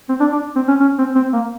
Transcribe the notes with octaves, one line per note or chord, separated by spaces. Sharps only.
C4
D4
D4
C4
C#4
C#4
C4
C4
A#3